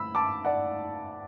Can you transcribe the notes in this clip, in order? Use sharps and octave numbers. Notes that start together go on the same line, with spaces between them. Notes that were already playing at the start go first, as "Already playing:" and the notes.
Already playing: B5 E6
A5 D6
D5 F#5